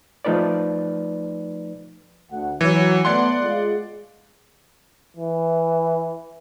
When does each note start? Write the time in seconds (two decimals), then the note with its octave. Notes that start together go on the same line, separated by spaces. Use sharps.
0.25 F3 A3 D#4 B4 D5
2.31 D2 F#5
2.61 E3 F#3
3.05 A3 B3 D5 F#5 C6
3.41 G#3 F4
5.16 E3